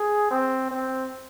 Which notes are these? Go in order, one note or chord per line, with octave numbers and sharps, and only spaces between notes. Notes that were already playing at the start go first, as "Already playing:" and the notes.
Already playing: G#4
C4
C4